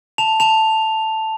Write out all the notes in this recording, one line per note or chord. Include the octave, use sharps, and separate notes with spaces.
A5 F7
A5 F7